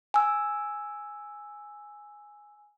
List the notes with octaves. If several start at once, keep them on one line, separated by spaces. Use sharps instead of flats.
G#5 E6